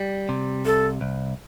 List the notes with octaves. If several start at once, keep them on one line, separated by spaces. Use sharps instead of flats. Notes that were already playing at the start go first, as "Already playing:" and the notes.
Already playing: G3
C3
C2 A4
C2